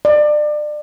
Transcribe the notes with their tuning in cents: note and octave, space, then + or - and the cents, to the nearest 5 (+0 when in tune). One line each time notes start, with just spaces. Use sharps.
D5 +30